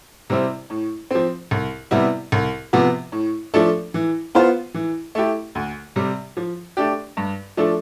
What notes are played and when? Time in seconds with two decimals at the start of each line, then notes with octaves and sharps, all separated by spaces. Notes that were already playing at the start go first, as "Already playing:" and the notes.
0.30 C3 G3 C4 E4
0.70 A2
1.11 F3 C4
1.51 C2
1.91 C3 G3 B3 E4
2.32 C2
2.73 C3 F3 B3
3.12 A2
3.54 F3 A3 D4 A4
3.94 E3
4.35 B3 F4 C5
4.74 E3
5.15 A3 E4 G4
5.55 D2
5.96 C3 G3
6.37 F3
6.77 A3 D4 G4
7.17 G2
7.57 F3 A3 D4 A4